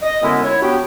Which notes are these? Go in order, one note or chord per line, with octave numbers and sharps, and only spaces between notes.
D#5
F#2 D3 G#3 B3 C#4 E4
E4 C#5
F#3 B3 D4 F#4 G4